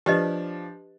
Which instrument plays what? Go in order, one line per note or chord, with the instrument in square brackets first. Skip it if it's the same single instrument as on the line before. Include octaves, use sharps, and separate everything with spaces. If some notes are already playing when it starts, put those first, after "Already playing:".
[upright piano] F3 D4 [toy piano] G4 B4 D#5